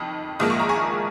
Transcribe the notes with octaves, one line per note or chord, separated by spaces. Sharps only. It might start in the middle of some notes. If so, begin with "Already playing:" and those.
Already playing: F2 D#3
A#1 G#2 F3 A#3 D#6
C#6
A#5
G#5 C#6